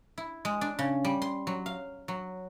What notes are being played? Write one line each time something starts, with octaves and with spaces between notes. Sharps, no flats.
E4
G#3
D4
C#3
G3
C6
F#3
F5
F#3